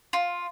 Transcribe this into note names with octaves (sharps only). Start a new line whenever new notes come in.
F4